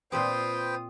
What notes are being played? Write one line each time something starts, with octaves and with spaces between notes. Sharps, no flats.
A#2 C4 F4 G4 B4 C5 G5 D#6